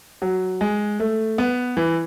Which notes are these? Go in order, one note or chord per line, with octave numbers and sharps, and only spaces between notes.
F#3
G#3
A3
B3
E3